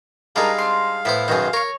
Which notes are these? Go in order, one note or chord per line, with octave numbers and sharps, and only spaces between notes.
G3 G#3 D4 D#4 A#4 F5
C4 D4 C6
A2 B3 E4 C5
F#2 B2 D#3 G#4 C5
A#4 C#5 C#6